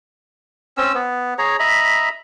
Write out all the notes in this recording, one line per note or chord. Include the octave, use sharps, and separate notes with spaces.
C4 C#4 E6
B3
G#4 C#5 A#5
D#5 E5 A#5 B5